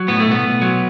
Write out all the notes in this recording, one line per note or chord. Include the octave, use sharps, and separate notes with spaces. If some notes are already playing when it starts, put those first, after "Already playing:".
Already playing: F#3
A2 B3
A3
B1
B3
B1
F#3